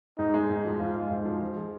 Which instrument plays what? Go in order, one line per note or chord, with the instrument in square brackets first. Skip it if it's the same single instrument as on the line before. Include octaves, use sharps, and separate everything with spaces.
[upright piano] G#2 [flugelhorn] D#4
[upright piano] G#3
G#2
F3
[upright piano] G#2 [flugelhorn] F4
[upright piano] G#3
G#2
F3
F3
G#4